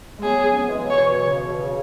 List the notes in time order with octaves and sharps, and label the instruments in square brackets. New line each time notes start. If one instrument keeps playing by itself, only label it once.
[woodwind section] G#3
[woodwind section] F#3 B3 [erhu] G#4
[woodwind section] C#4
F#3 B3
E3 G#3
C#3 F#3
[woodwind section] B2 E3 [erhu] C#5
[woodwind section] B2 E3
C#3
B2
C#3